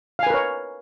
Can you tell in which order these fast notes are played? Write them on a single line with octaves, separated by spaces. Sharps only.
F5 G#5 B4 A#4 C#5